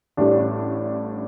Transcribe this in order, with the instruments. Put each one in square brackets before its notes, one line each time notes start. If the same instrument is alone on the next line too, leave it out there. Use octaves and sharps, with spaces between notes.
[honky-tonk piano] A1 A2 G3 D4